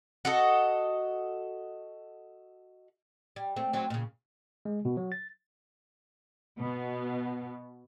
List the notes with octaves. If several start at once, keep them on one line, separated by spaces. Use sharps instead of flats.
F#4 A4 D#5
G3
A3 C4
F#3 C4
A#2 C#3
G#3
B2
F#3
A6
B2 B3